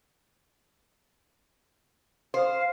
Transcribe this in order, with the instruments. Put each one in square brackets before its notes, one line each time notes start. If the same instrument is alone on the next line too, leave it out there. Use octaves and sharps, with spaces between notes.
[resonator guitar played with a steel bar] C5 [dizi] F5